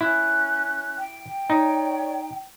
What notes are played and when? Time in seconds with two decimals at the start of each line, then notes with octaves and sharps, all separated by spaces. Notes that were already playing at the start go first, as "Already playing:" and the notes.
0.01 C#4 E4 F#6
0.98 G5
1.50 D#4 C#5 D5